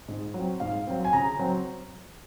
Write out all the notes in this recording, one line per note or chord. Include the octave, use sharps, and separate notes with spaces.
G#2
F#3 C4
G#2 F5
F#3 C4
G#5
C#3 A#5
F#3 C4